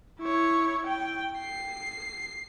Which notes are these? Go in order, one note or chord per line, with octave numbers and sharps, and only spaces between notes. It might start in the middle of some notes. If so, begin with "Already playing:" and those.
E4 C#5
G5
C7